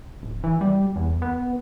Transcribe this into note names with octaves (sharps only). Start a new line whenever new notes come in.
D1
E3
G3
E2
B3